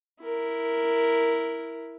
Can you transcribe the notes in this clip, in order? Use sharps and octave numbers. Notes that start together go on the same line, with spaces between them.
E4 A#4